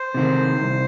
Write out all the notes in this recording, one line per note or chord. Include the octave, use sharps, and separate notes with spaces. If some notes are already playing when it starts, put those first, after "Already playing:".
Already playing: C5
C3 D#3 C4
C2